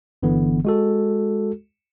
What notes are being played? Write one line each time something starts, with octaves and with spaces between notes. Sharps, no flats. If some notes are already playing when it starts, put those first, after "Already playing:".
G1 D3 E3 B3
G#3 F#4 A4